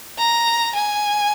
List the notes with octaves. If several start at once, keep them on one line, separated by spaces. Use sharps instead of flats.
A#5
G#5